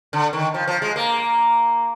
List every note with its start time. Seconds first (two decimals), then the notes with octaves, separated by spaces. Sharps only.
0.13 D3
0.33 D#3
0.54 F3
0.68 F3
0.82 G#3
0.96 A#3